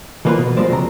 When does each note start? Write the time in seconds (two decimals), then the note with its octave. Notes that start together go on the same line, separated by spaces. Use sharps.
0.25 E3 F3 A#3 F4 B4
0.38 B2
0.57 F3 G3 G#3 A#3 C5 D5
0.69 F2 C#3 A#5